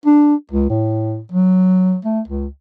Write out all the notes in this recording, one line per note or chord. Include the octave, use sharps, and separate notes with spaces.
D4
C#2
A2
F#3
A3
C#2